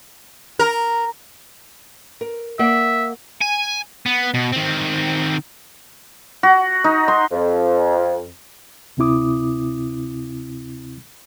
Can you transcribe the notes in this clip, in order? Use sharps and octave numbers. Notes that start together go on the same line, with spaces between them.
A#4
A#4
A#3 D5 E5 F#5
G#5
B3
B2
D#3 C4
F#4
D#4
C6
F2
D2 C3 C4 E4 D6 D#6